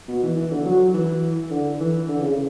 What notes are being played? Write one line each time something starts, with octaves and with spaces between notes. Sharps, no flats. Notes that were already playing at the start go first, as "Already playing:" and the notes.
B2
E3
E3
D3
F#3
E3
D3
E3
D3
C#3